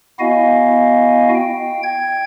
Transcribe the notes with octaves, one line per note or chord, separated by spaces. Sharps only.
B3 E4 F#4 D#5 F5 G#5
G5
G5 G#6